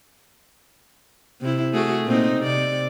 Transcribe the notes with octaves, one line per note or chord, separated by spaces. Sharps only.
C3 E4
A3 F#4 G#4
A#2 C4 D#4
C3 D5